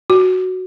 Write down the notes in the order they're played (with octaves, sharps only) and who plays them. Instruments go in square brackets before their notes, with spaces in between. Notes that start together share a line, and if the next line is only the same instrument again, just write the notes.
[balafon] F#4